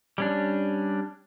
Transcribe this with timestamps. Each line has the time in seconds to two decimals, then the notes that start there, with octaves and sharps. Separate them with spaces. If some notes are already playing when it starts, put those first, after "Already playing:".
0.18 G3 C#4 D4